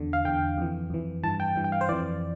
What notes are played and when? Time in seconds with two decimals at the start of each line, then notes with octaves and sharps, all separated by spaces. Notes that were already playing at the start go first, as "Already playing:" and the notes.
Already playing: E2 D3
0.13 F5
0.25 E2 D3 G5
0.58 F2 E3
0.90 F2 E3
1.23 G2 E3 A5
1.40 G5
1.56 G2 E3
1.64 G5
1.72 F5
1.81 C5
1.89 F2 E3 D5